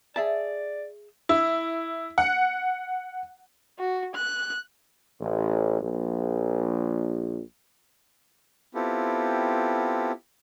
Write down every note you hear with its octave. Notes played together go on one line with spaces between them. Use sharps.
G#4 D5 E5 A5
E4
F#5
F#4
F#6
A1
A#1
B3 C4 E4 F4 G4 A4